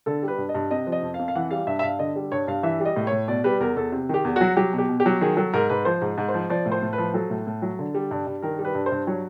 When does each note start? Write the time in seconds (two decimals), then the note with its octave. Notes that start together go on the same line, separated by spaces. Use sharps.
0.06 D3 A4
0.23 G3
0.28 B4
0.38 G2
0.49 D#5
0.55 G2
0.71 C3 D#5
0.87 F3
0.92 D#5
1.02 F2
1.14 F5
1.19 F2
1.28 F5
1.35 E3 F#5
1.51 G3 F5
1.67 G2 E5
1.79 E5
1.83 G2 F5
1.99 D3 D#5
2.16 G3
2.32 G2 C#5
2.47 G2 F5
2.63 E3 E5
2.80 G3
2.85 D#5
2.96 A2
3.07 A2 C#5
3.28 B2 D5
3.44 G3 B4
3.60 E2 A#4
3.76 E2 A4
3.92 C3
4.09 D#3 G4
4.25 E2
4.36 F#3 F#4
4.57 F#3 G4
4.73 B2
4.78 G4
4.89 B2
5.00 G4
5.06 F#3
5.21 D#3 G#4
5.37 F#3 A4
5.53 G#2 A#4
5.69 G#2 B4
5.85 F3 C5
6.01 G#2
6.18 G#2
6.28 C5
6.34 F3
6.50 F3 D5
6.66 A2
6.72 C5
6.82 A2
6.93 B4
6.98 F3
7.14 F#3 A4
7.30 A2
7.47 A2
7.62 F#3
7.79 D3
7.94 G3
8.11 G2
8.27 G2
8.42 D#3 A#4
8.59 G3
8.65 B4
8.75 G2
8.86 C5
8.91 G2
9.07 F#3 C#5